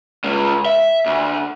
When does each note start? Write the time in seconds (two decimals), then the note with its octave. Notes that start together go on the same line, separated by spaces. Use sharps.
0.24 C#3 G#3
0.66 E5
1.06 D2